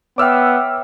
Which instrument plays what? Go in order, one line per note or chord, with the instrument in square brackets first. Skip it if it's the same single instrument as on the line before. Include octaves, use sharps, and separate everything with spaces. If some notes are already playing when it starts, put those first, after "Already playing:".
[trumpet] B3 [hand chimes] C#5 E5 G5 [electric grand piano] D6 E6 F6